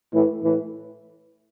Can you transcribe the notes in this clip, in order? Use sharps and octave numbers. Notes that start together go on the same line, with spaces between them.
A2 E3
A2 E3